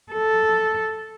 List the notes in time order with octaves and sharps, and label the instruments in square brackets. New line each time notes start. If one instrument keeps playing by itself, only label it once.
[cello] A4